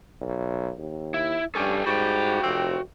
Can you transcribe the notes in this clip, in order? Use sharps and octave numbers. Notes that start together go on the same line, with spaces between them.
B1
D#2
E4
G2 C#4 G4 A4
G#2 G3 F#4 G5
F1 C4